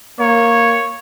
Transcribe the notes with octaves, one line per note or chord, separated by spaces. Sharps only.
A#3 C#5